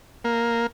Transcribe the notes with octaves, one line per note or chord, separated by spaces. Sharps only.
A#3